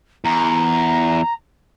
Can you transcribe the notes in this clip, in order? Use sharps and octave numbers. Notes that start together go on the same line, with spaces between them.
E2 A#5